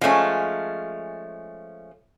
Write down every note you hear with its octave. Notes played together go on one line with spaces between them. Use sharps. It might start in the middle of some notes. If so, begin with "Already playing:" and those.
F3 G#3 A3 C#4